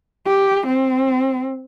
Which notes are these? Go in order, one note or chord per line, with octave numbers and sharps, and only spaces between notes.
G4
C4